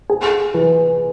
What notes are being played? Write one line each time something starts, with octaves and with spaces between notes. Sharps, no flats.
G#4
E3